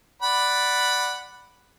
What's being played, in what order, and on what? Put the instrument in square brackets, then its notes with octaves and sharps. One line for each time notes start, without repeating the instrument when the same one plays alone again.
[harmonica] D5 F#5 B5